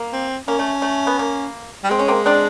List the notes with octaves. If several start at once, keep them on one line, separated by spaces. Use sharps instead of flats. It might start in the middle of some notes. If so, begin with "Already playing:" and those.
Already playing: A#3
C4
A#3 C#4
A3
A3
B3
A#3
G3
G#3 C4
C#4
A#3 C4
C4 D4